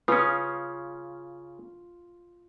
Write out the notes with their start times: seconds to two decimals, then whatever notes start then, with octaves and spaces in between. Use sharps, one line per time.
0.08 C#3 C#4 F4 B4 D#6